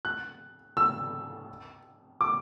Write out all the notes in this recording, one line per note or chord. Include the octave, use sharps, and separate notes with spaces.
F#6
E6
D6